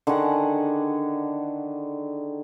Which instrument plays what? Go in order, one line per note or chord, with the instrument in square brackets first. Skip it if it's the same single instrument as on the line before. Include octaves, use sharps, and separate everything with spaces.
[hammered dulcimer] D3 D#3 G#4 F#5